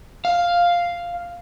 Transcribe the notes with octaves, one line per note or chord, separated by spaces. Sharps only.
F5